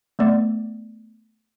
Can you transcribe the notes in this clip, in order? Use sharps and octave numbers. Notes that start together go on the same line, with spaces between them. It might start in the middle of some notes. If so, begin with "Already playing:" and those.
A3 B3 D5